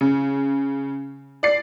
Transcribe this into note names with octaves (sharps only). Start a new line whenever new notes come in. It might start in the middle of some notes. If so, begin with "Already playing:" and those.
C#3
D5 C7